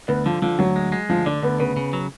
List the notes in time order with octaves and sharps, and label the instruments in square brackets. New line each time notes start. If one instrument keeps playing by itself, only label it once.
[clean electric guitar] D2 [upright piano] B3
[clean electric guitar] D3 [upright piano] F3
[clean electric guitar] D3 [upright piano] F3
[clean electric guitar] D2 [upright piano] F#3
[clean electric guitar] G#3
G#3
[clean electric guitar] D2 [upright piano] F3
[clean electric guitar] D3 [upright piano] D4
[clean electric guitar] D2 [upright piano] B3
[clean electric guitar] C#3 [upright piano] B3
[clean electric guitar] C#3
F#3